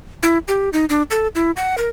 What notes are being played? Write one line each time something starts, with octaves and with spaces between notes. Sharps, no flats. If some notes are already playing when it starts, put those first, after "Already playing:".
E4
G4
D#4
D4
A4
E4
F#5
A#4